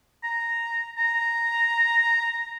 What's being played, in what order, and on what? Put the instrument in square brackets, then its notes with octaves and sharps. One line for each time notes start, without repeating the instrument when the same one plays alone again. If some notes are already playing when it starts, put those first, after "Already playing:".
[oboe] A#5
A#5